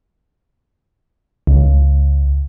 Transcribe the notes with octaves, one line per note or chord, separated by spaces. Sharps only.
C#2